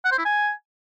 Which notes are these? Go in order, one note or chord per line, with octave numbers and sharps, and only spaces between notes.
F#5
C5
E4
G#5